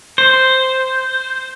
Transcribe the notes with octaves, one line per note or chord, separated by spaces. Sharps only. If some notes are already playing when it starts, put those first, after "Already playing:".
C5